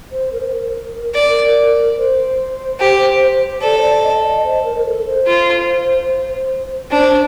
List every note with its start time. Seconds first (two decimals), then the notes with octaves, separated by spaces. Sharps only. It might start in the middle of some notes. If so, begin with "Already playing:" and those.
0.12 C5
0.32 A#4
0.40 C5
0.48 A#4
1.15 D5
1.97 C5
2.80 G4
3.62 A4 D5
3.78 C5
3.83 D5
4.03 D#5
4.24 D#5
4.44 C5
4.64 A#4
4.77 A#4
4.85 A4
5.06 C5
5.27 F4
6.91 D4 C5